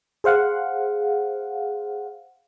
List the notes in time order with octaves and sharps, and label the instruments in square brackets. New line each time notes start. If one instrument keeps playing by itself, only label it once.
[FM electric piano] G#4 C5 F5 F#5